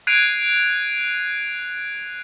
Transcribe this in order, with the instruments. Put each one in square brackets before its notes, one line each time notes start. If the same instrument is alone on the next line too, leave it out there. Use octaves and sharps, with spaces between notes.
[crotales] F#6 G#6 C7 D7 D#7 F7